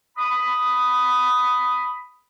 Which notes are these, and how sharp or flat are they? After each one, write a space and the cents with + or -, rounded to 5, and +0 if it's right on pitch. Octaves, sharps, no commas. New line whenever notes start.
B5 +5 D#6 +0